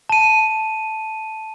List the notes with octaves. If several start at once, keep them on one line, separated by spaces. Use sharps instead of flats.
A5 D#7